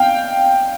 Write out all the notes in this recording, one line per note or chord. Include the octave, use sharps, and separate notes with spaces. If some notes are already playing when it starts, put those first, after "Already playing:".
Already playing: F5 G5